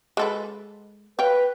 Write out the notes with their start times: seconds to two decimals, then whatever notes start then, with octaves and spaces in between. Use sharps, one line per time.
0.17 G#3 A4 B4
1.19 B4 C#5 F5 G5